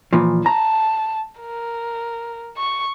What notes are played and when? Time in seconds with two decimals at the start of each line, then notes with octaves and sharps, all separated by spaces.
0.13 A#2 E3 F3
0.46 A5 A#5
1.41 A#4
2.57 C#6